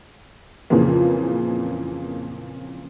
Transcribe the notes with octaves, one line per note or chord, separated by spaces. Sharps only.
F2 A#2 C#3 E3 F3 A#3